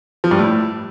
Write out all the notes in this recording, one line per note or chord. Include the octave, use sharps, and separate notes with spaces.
F3
G2
A2